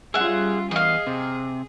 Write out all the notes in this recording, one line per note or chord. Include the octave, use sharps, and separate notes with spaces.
G3 C#4 F4 G#4 E5 F#5
E2 G#4 D#5 F5
C3